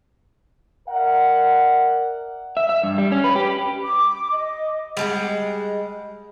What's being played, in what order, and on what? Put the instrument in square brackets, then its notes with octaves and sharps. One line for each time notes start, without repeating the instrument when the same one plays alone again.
[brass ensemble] A#4 D5 E5 F#5
[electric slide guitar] E5
E5
G2
G3
C#4
B4
G4
[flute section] D6
D#5
[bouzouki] G3 G#3 F#5